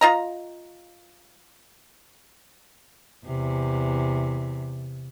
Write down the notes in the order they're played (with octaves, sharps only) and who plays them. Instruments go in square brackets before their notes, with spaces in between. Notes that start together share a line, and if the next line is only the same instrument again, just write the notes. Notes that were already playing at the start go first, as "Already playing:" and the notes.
[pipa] F4 D#5 A#5
[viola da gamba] E2 C3